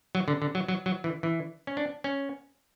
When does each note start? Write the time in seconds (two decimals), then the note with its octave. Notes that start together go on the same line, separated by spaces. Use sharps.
0.15 F#3
0.28 D3
0.42 D3
0.55 F#3
0.68 F#3
0.86 F#3
1.04 E3
1.23 E3
1.67 C#4
1.77 D4
2.04 C#4